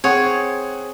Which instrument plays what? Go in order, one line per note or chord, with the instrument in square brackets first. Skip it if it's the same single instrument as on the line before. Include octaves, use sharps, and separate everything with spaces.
[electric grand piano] C4 G#4 F#5 [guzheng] C#5